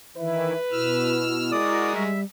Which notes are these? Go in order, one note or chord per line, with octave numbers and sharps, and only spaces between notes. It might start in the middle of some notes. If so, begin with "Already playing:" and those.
D#3 E3 E4 B4 E5
B2 E4 E6 F6
G#3 F#4 A#4 D5 D#6
G3 E5